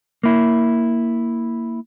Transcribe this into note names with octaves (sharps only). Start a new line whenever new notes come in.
A#3 E4